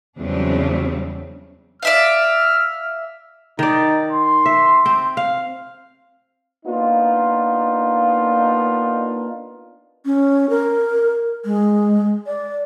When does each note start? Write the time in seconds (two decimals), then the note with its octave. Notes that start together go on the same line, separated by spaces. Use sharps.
0.18 E2 C#3 F#3 G3 C4 D4
1.82 D5 E5 F5 F6
3.59 D#3 D#4 D5
4.12 C6
4.46 E5
4.86 C4
5.17 F5
6.66 A#3 B3 D4 D#4 F4
10.06 C#4
10.50 A#4
11.45 G#3
12.27 D5